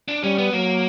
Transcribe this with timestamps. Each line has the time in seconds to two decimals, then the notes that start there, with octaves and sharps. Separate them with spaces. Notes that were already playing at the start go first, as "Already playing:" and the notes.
0.08 D4
0.23 G3 C#4
0.38 B3
0.53 F#3 A#3